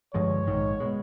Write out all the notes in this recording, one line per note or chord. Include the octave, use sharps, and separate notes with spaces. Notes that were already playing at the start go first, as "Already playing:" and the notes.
G2 D3 F3 G#3 C#5
A#1 G#2 D#3
B2 G#3